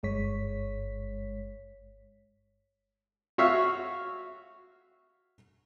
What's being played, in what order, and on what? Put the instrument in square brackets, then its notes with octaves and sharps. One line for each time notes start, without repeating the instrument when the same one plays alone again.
[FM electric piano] G1 G2 G#3 C#5 B6
[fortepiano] F#4 C#5 E5 F5 F6